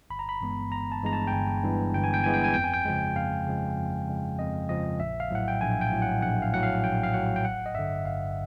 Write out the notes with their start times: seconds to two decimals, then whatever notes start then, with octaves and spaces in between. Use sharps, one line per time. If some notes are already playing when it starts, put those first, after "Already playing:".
0.10 G1 B5
0.19 A#5
0.29 B5
0.41 G2 E3 G#3 B3
0.72 G1 A#5
0.92 A5
1.03 G2 E3 G#3 B3 A#5
1.13 A5
1.27 G5
1.33 G1 G#5
1.63 G2 E3 G#3 B3
1.94 G1 G5
2.04 G#5
2.14 G5
2.24 G2 E3 G#3 B3 G#5
2.34 G5
2.44 G#5
2.54 F2 G5
2.64 G#5
2.74 G5
2.85 C#3 F3 G#3
3.16 F2 F5
3.47 C#3 F3 G#3
3.77 F2
4.08 C#3 F3 G#3
4.39 F2 D#5
4.69 C#3 F3 G#3 D#5
5.00 A#1 E5
5.20 F5
5.30 A2 F#3 F#5
5.48 G5
5.61 A#1 G#5
5.81 G5
5.92 A2 F#3
6.02 F#5
6.22 A#1 F#5
6.42 F5
6.52 A2 F#3 F#5
6.63 F5
6.83 A#1 G5
7.03 F5
7.13 A2 F#3 F#5
7.36 G5
7.44 G1 F#5
7.66 D#5
7.75 G2 D3 E5
8.05 G1 F5